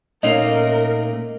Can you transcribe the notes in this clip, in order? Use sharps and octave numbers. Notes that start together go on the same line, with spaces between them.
A#2 A3 C#4 D#4 A#4 D#5 F5